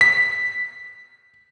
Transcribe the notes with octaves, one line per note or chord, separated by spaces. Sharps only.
B6